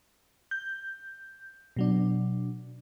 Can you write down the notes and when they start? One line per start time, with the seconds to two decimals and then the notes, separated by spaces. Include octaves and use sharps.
0.51 G6
1.76 B2 F#3 D4